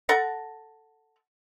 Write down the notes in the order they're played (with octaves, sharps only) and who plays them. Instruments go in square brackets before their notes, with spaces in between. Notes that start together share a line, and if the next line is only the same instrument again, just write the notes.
[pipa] A4 F#5 A#5